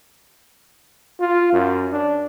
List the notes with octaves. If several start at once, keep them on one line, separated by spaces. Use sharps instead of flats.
F4
F#2
D4